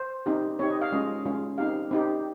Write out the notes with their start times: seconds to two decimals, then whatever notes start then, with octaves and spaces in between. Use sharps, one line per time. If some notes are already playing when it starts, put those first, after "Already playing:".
Already playing: C5
0.26 C4 D#4 G4
0.59 C4 D#4 G4 C#5
0.70 D#5
0.81 F5
0.92 G#3 C#4 F4 D#5
1.25 G#3 C#4 F4
1.58 C4 D#4 G4 F5
1.91 C4 D#4 G4